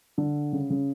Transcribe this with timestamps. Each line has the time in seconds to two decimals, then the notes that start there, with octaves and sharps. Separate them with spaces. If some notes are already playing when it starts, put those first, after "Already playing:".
0.18 D3
0.53 C#3
0.70 C#3